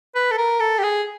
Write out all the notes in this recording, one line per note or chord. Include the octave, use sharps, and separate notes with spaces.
B4
A4
A#4
A4
G4
G#4